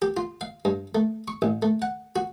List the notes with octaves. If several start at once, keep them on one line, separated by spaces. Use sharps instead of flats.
G4
F4
F5
G2
A3
C#6
A1
A3
F#5
F#4